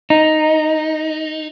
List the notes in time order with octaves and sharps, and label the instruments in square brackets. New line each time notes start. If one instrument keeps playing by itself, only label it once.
[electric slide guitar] D#4